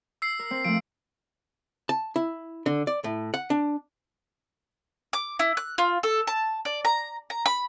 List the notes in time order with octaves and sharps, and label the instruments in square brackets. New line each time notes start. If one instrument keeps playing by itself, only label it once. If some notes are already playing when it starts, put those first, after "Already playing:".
[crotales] E6 C7
[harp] A#4
C4
[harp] F3 A3 [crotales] D7
[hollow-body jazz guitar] A5
E4
D3
D5
A2
F#5
D4
[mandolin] D6
E4
F#6
F4
A4
A5
D5
A#5
A#5
B5